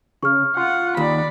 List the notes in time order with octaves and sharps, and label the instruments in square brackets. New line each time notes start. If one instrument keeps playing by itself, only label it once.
[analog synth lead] C#3 [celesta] C#6 F6
[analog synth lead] F4 [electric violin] F#5
[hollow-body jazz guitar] D#2 [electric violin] D5 B5